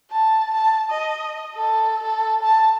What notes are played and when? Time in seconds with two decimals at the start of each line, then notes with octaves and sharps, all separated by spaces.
0.11 A5
0.54 A5
0.90 D#5
1.56 A4
2.03 A4
2.43 A5